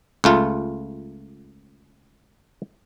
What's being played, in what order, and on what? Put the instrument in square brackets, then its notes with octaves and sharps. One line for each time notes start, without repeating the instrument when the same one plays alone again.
[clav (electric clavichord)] C#2 A3 F4